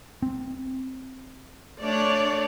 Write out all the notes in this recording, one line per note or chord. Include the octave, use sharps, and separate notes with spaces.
C4
A3 D4 C#5 D5